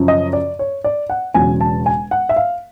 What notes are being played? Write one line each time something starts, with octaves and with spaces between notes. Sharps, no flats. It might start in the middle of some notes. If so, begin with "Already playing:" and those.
Already playing: F#2 C#3 F3
D#5
D5
C#5
D5
F#5
E1 E2 C#3 F#3 G#5
A5
G#5
F#5
E5
F5